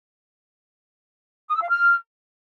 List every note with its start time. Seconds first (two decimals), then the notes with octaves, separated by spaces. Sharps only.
1.49 D#6
1.56 E6
1.62 F5
1.69 F6